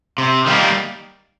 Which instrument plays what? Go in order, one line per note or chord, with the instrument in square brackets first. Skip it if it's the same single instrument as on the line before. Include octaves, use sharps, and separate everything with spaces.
[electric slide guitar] C3
D#3 G3 A#3